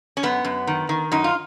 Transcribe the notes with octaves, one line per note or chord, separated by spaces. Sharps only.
C#4
F#2 B3
F#2
D#3
D#3
F#2 D#4
F4